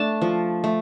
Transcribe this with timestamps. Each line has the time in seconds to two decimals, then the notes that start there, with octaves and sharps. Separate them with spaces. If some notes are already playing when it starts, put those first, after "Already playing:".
Already playing: A3 D4 A5
0.22 F3
0.64 A3